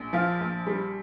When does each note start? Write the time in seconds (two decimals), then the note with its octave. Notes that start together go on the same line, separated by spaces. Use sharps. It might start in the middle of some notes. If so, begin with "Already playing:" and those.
Already playing: A#1
0.13 F3 F4 F5
0.40 A#1
0.67 G3